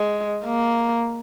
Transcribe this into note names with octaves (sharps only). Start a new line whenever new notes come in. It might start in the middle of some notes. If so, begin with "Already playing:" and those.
Already playing: G#3
A#3